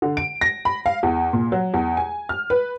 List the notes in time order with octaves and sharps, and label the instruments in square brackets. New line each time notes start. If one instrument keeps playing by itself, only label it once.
[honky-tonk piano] D3
D7
A#6
B5
F5
E2
A#2
F#3
E2
G#5
F6
B4